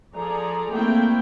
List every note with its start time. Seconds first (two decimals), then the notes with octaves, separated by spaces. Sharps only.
0.15 F3 G#4 A4 D5 A#5
0.70 A3 A#3 C4 E4 G5